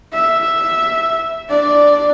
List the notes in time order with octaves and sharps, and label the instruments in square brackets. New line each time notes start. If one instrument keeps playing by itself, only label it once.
[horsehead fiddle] E5
D4 D5